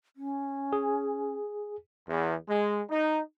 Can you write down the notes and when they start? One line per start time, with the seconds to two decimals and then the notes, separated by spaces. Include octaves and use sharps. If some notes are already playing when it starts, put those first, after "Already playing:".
0.16 C#4
0.73 G#4
2.08 E2
2.49 G#3
2.90 D#4